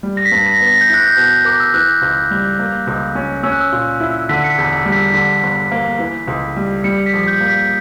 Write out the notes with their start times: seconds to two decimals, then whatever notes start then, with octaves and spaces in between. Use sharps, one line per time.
0.03 G3
0.17 A#6
0.25 B6
0.32 G2
0.46 A#6
0.61 B3
0.67 A#6
0.81 G6
0.89 E4 F#6
1.07 G6
1.16 B2
1.45 A#4 D6
1.60 E6
1.74 E3 F#6
2.02 C#2
2.31 G3
2.59 A#3
2.87 C#2
3.15 C#4
3.44 C#4 E6
3.52 F#6
3.61 E6
3.72 A#2
4.00 E4
4.29 D3 B6
4.44 C#7
4.50 B6
4.58 E1
4.86 G3
4.92 B6
5.14 D3 B6
5.43 G1
5.71 A#3
5.99 E3
6.27 C#2
6.56 G3
6.84 G3 C#7
7.06 B6
7.13 A#1
7.28 G6
7.40 A#3
7.48 B6